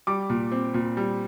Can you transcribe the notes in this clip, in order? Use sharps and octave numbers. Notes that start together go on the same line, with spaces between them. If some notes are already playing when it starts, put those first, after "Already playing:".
G3 D6
A#2
C4
A#2
G3